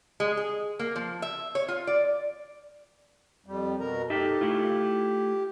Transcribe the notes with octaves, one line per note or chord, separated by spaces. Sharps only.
G#3
G#4
A#3
F3
E5
C#5
F4
D5
F2 G3
B2 A#4 A#5
D#4 G4 A4 E5
A3 E4 F4